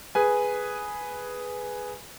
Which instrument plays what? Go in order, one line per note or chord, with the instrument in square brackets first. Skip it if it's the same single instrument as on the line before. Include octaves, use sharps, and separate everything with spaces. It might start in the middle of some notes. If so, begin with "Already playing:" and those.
[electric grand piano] G#4 B4 G#5